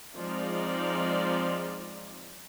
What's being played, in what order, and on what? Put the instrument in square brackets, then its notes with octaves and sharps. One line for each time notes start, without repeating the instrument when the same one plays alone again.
[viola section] F3 G#3 C4 D#4 F4 D5